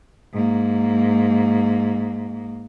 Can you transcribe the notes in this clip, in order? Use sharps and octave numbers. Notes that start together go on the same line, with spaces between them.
G#2 A#3